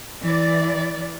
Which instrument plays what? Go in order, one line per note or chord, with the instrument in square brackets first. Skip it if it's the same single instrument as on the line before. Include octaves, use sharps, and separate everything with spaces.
[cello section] E3 D5